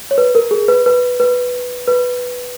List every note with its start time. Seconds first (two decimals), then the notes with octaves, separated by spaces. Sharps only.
0.11 C#5
0.18 B4
0.35 A#4
0.51 G#4
0.68 B4
0.86 B4
1.20 B4
1.88 B4